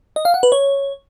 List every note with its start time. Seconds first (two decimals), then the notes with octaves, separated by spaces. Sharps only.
0.16 D#5
0.25 F5
0.34 F#5
0.43 B4
0.52 C#5